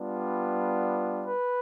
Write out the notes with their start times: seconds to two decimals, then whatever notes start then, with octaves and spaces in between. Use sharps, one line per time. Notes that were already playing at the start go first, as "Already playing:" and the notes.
Already playing: G3 B3 D4 F4
1.26 B4